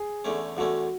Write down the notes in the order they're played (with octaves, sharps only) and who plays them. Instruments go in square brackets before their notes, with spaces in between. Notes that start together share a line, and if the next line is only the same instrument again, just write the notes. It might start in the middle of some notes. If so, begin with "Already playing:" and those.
Already playing: [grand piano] G#4
[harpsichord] E2 D3 A3 C#4
[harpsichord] E2 D3 A3 C#4 [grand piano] F#4